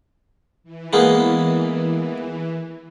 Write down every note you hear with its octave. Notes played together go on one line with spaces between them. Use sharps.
E3
G#3 A#3 B3